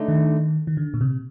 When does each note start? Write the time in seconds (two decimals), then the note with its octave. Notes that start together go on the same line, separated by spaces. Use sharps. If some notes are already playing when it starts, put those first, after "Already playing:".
Already playing: D3 A3 D#4
0.08 D#3
0.67 D#3
0.77 D3
0.94 A#2
1.01 C3